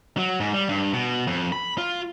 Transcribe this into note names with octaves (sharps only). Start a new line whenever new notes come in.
F#3
G#2
G3
G2
B2
F2
B5
F4